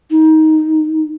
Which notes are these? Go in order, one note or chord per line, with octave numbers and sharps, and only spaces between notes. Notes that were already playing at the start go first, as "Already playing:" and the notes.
D#4